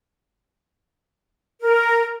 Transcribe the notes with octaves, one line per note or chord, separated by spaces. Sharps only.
A#4